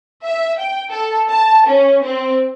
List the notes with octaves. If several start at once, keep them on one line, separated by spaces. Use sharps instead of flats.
E5
G5
A4
A5
C#4
C4